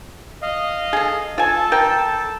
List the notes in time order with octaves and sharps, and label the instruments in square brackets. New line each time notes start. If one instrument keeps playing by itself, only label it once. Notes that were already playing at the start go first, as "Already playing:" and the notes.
[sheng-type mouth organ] D#5 F5
[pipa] G#4 A4
[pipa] F4 G#5 [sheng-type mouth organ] A4 A5
[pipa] A#4 G5